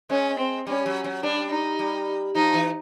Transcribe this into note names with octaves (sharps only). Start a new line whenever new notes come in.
G#3 C#4
C4
G3 C#4
F#3
F#3
G3 D4
D#4
G3
F3 D#4
E3